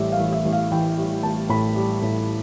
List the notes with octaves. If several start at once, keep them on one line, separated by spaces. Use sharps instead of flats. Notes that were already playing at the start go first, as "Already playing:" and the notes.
Already playing: A1 A2 G3 E5
F5
A1
E5
A1
F5
E3 G5
G3
A1 A5
A2 B5
G3
A2